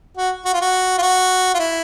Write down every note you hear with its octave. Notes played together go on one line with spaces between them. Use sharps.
F#4
F#4
F4
F#4
F4
F#4
F4
E4